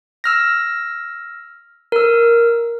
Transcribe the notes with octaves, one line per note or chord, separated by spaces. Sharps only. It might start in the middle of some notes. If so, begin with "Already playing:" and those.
E6 F6 A#6
A#4 E6